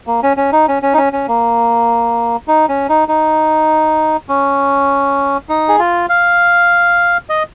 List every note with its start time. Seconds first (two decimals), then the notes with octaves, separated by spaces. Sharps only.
0.07 A#3
0.23 C#4
0.37 C#4
0.52 D#4
0.68 C#4
0.83 C#4
0.94 D#4
0.97 C#4
1.13 C#4
1.28 A#3
2.48 D#4
2.69 C#4
2.89 D#4
3.08 D#4
4.29 C#4
5.49 D#4
5.69 G#4
5.79 F4
6.09 F5
7.30 D#5